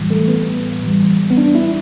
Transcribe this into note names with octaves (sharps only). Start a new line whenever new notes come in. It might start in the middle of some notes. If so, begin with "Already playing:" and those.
Already playing: A2 E3 G3
A3
B3
A2 E3 G3
B3
D4
E4